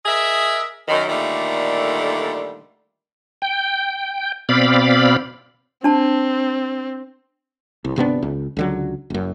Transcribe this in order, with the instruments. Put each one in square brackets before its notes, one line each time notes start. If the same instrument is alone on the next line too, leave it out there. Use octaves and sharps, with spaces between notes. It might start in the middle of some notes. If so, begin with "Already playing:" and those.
[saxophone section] G#4 A#4 D#5 E5
F#2 D#3
A#2 D3 D#3 G3 A3
[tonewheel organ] G5
B2 C4 D5 F5 B5
[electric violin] C4 [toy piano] D4 A5
[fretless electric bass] C2
G1 C3 B3 D4
C#2
C#2 D3 F#3
F#1 F#2